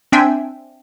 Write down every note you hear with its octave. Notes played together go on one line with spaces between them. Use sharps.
C4 D4 E5 G5 G#5